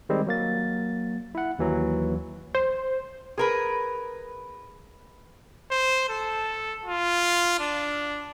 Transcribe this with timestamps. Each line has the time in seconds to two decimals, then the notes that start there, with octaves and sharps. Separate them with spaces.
0.09 D#3 G3 G#3 C4
0.27 F#3 A#3 A6
1.35 E4 F#5
1.59 D#2 E3 F#3
2.55 C5
3.38 G#4 A#4 B4
5.71 C5
6.09 A4
6.86 F4
7.59 D4